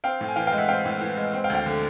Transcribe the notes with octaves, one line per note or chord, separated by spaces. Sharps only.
C4 F5 G5
A2
G#5
E3 F5 G5
F5 G5
G#3
E5 F#5
C4 F5 G5
A2
E3
G#3
C4
F5 G5
D2
F5 G5
D3